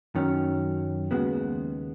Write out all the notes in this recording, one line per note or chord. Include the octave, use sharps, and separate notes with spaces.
F#2 D#3 F#3 C#4
D#2 C#3 G#3 B3 F#4